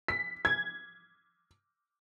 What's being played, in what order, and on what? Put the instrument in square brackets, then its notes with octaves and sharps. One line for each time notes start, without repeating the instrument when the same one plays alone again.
[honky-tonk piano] B6
G#6